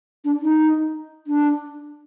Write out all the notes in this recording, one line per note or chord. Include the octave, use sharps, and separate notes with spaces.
D4
D#4
D4